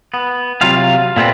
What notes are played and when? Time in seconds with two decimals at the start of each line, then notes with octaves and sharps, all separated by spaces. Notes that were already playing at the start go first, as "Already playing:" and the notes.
0.14 B3
0.61 C3 F#3 F4 F5
1.16 A#2 A3 B3 C4